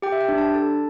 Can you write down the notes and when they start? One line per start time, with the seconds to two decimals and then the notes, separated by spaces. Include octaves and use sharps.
0.02 G4 G5
0.12 E5
0.21 G5
0.29 D4
0.38 A5
0.54 A4 A5